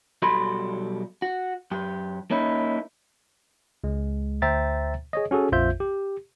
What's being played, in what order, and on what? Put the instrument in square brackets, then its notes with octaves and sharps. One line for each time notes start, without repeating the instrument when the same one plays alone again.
[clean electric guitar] B1 G3 F#4 A4 B5 C6
F#4
F#2 G4
A#3 C#4 D#4 E4
[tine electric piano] C#2 G#3
D2 C5 E5 G5 A#5 A6
G#4 C#5 D#5
C#4 F#4 G#4 A4
A#1 F2 F4 C5 E5 G6
G4